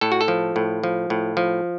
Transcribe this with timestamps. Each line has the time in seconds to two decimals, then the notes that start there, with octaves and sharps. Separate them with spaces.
0.01 A2 A4
0.12 F#4
0.21 A4
0.28 F3
0.56 A2
0.84 F3
1.10 A2
1.37 F3